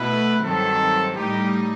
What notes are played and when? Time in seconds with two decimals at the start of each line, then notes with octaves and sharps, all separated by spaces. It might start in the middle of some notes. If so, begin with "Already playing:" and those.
Already playing: B2 A3 E4 B4
0.43 G2 D#3 F#3 C4 A4
1.15 A2 G3 D#4 G4